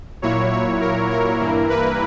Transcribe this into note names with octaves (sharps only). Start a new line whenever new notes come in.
A#2 F#3 A#3 E4 C#5
C#5
A#4
A#4
G2 E3 A#3 E4
B4